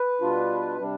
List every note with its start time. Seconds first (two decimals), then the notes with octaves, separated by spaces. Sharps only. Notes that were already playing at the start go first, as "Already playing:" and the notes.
Already playing: B4
0.21 B2 G3 D4 F4
0.77 C3 G3 D4